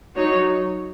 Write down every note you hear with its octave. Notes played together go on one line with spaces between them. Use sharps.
F#3 D#4 F#4 C#5